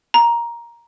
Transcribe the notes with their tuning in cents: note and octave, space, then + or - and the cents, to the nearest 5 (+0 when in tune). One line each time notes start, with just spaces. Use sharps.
A#5 +10